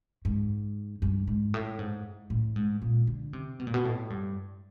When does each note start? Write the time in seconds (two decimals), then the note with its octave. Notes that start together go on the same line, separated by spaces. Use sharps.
0.25 G#2
1.02 G2
1.27 G#2
1.54 A2
1.79 G#2
2.30 A2
2.56 G#2
2.82 A#2
3.07 D3
3.33 C3
3.59 B2
3.67 A#2
3.74 B2
3.85 A2
4.10 G2